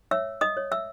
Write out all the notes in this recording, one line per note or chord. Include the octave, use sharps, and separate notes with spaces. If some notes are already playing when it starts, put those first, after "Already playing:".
C#5 E5 E6
D#5 D#6
C#5
E5 E6